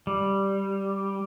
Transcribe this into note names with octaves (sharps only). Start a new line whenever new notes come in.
G3